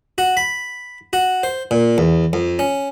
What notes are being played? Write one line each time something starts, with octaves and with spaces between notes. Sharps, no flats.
F#4
B5
F#4
C5
A#2
E2
F2
C#4